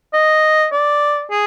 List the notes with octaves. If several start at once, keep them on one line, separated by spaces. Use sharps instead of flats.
D#5
D5
G#4